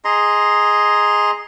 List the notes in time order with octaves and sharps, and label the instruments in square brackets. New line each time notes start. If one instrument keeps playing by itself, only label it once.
[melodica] G#4 D#5 A#5 C6